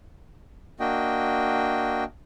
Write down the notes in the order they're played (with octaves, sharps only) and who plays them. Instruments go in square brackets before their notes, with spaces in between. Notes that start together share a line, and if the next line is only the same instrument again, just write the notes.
[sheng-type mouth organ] A#3 D4 F#4 D#5 G5